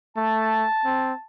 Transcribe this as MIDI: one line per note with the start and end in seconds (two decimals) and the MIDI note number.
0.17 0.67 57
0.17 1.26 81
0.85 1.13 60